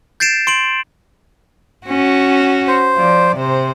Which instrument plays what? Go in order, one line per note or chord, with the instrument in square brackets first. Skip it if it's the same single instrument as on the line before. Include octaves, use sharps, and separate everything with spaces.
[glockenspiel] G6 A6 C7 D7 E7
C6 D7 F#7
[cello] C#4 F#4
[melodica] C5
[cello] F3 D5
C3 C5